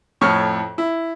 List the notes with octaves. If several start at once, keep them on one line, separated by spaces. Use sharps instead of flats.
F2 A2 C#5 C#6 F6
E4